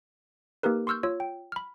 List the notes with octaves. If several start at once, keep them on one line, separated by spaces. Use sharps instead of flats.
A#3 D#4 G4 A#4 B4
C6 C#6 E6 F6 G6
F4 C#5 E6
G5
B5 F6